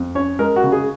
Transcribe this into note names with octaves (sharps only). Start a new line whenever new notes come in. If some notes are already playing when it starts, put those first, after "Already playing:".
Already playing: F2
C#4 C#5
G#3 A#4
F#4
C#3
G#4